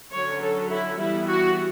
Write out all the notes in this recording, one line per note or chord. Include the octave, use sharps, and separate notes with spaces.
D3 F#3 C#4 C#5
A4
E4
E3 G3 B3 E4
F#4